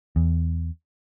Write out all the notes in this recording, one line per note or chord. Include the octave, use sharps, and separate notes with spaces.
E2